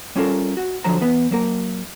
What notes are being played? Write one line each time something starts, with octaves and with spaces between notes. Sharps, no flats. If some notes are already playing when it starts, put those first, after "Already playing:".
G3 C#4 F4 A4 A#4
F#4
D3 F3 F#3 C5 A#5
E2 B3 B4
F#3 A#3 A#4